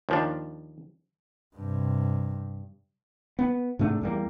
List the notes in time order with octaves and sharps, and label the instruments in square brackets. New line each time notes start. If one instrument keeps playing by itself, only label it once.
[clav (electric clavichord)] D#2 F3 D4
[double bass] G2 C3
[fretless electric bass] B3
G#2 C3 A3 D4
E2 G3 A#3